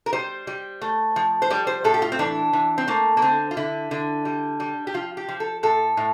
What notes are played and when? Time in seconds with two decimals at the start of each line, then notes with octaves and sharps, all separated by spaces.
0.06 A#4
0.13 G3 C5
0.47 G3
0.81 A3
1.16 F3
1.42 C5
1.50 G3 D5
1.67 C5
1.84 A2 A4
1.94 G4
2.02 F4
2.12 C4
2.19 E3 D4
2.53 E3
2.78 C4
2.88 A3 A#3
3.17 A#3
3.22 D3 C4
3.51 F4
3.57 D3 E4
3.91 D3
4.25 G3
4.60 G3
4.87 G4
4.94 F3 F4
5.17 G4
5.28 F3
5.40 A4
5.63 A2 A4
5.97 A2